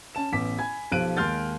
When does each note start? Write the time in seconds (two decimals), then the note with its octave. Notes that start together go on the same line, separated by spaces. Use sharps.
0.15 C#4 A5 E7
0.32 A1 B3 D6 B6
0.59 G#5 B5 G#6
0.92 B1 F3 G4 F#6 D7 D#7
1.17 D#2 G#3 C6 F6 G6 A6